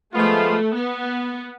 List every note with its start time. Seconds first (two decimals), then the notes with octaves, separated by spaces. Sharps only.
0.13 F3 G#3 A3 B3 F4
0.75 B3